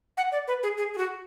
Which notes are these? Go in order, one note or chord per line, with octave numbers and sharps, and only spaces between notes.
F#5
D5
B4
G#4
G#4
G#4
F#4